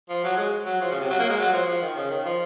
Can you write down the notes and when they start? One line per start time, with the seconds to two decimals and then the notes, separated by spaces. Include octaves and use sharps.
0.09 F3
0.24 F#3
0.37 G#3
0.66 F#3
0.81 F3
0.91 C#3
1.01 C3
1.10 F#3
1.19 A#3
1.29 G#3
1.39 F#3
1.53 F3
1.68 F3
1.82 D#3
1.96 C#3
2.11 D#3
2.25 F3